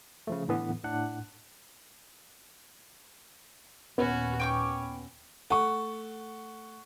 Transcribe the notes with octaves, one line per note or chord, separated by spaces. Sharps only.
C#3 F3 A3
A2 D3 E3 B3
A2 D4 F#5 F#6
D#2 A#2 B3 C#4 F#4
C#4 G5 C#6 D6
A3 F#5 C#6